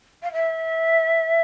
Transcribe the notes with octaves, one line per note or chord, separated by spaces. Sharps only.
F5
E5